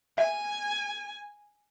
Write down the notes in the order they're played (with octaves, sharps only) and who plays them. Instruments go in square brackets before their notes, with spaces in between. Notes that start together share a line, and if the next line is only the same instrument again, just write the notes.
[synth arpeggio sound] E5 [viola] G#5